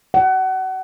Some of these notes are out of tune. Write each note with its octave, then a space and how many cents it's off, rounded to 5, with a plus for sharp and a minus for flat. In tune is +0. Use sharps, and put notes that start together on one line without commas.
F#5 +30